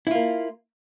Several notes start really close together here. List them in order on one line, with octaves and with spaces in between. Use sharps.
E4 F4 A#3